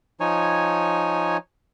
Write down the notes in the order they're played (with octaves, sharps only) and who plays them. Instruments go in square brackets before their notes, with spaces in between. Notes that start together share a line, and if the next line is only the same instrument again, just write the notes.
[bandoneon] F3 D#4 C#5 G#5